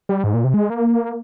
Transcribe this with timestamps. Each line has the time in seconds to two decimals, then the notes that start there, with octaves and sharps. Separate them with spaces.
0.09 G3
0.24 G#2
0.34 A#2
0.44 C3
0.54 G#3
0.70 A#3